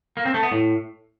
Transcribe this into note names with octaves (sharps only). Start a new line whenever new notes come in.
A#3
C4
A3
B3
A2